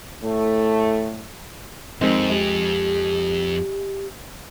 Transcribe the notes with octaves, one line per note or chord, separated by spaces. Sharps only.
A2 A3
F2 D#3 G#3 C4
G#3 G4